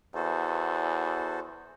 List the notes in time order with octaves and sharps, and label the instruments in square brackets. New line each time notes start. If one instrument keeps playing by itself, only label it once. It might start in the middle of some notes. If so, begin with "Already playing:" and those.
[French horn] E2 [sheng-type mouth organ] F#4 A4 C5